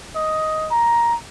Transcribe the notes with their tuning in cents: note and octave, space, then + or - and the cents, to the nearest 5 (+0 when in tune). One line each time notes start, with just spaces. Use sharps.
D#5 +10
A#5 +10